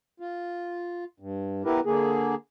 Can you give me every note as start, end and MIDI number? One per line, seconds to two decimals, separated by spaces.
0.20 1.04 65
1.20 1.63 43
1.65 1.80 59
1.65 1.80 64
1.65 1.80 67
1.65 1.80 70
1.65 1.80 71
1.86 2.35 50
1.86 2.35 58
1.86 2.35 68